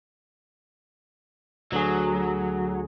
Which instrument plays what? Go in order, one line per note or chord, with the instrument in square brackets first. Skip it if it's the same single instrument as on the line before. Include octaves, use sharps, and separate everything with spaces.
[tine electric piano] D2 D3 G#4 [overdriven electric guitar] F#3